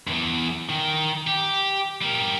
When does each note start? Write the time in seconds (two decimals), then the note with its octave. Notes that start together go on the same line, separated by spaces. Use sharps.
0.07 E2 G2
0.69 D#3
1.27 G4
2.02 G3 A#4